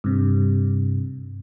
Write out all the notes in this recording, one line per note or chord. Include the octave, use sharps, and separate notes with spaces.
G2 C3